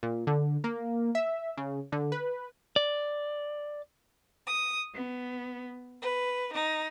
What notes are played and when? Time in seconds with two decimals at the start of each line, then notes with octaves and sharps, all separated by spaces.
0.03 A#2
0.27 D3
0.64 A#3
1.15 E5
1.57 C#3
1.92 D3
2.12 B4
2.76 D5
4.46 D#6
4.93 B3
6.01 B4
6.53 D#4